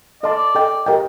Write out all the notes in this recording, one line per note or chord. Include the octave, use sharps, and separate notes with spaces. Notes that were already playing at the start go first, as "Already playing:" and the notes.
A4 D5 D#5 A5 C6
A4 D#5 G5
G4 A#4 D#5 G5